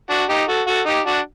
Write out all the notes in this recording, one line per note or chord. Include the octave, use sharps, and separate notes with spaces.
D4 F#4
D#4 G4
F#4 A4
F#4 A4
D#4 G4
D4 F#4